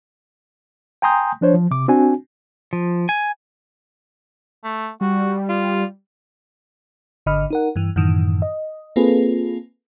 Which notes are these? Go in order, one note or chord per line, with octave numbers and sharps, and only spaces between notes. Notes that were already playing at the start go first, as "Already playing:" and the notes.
G5 G#5 A#5 C6 D#6 G6
F3 D4 C5 C#5
F3
C3 D6
C4 D4 F#4 G#5
F3
G#5
A3
G3 F#4
F4
G#1 D3 D#5 B5 F6
D#4 A#4 F#5
G2 E3
F#2 A2 D#3 E3
D#5
A#3 C4 F4 G#4 A4 B4